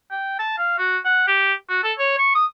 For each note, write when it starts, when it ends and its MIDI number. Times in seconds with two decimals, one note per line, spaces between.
0.11 0.36 79
0.39 0.56 81
0.58 0.77 77
0.78 0.98 66
1.05 1.23 78
1.27 1.54 67
1.69 1.83 66
1.84 1.93 69
1.99 2.15 73
2.18 2.35 85
2.35 2.45 87